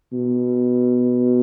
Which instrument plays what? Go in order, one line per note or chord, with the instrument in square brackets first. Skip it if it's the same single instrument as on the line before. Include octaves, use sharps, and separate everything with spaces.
[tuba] B2